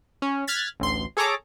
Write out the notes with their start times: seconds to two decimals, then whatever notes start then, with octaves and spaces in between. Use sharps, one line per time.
0.22 C#4
0.47 F6 F#6 G#6 A6 B6
0.80 A1 D2 C6
1.17 G#4 A4 C#5 A#5 D6